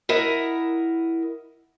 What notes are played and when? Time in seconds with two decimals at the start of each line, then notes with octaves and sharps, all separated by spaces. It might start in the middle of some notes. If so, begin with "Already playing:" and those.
0.09 E4 A#4 D#5 F#5